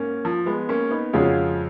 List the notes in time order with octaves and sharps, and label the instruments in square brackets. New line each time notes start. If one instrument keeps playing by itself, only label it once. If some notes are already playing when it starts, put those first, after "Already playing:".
Already playing: [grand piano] G#2 [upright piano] A#3 C#4
[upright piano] F3
G#3 B3
A#3 C#4
B3 D#4
[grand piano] F2 C#3 G#3 C#4 F#4 [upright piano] F4 G#4